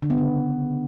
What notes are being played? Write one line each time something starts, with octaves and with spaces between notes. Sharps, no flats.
D3
B3
C#3